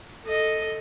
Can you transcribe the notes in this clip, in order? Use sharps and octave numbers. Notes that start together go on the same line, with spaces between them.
A4 D#5